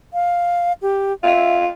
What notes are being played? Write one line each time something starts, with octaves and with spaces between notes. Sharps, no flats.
F5
G4
F4 E5